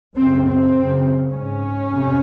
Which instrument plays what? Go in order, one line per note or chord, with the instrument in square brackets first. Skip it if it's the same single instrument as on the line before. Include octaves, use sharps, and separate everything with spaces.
[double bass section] F#2 C#3 C4
C4
F#2 C#3
G#2 C#4
F2 C3